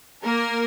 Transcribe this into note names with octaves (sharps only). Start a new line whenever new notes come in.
A#3 A#4